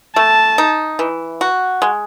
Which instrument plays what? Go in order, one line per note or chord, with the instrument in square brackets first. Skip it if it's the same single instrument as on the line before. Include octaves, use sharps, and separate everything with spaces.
[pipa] A3 [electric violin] A5
[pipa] D#4
E3
F#4
G#3